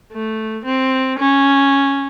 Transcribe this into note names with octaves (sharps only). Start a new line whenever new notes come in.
A3
C4
C#4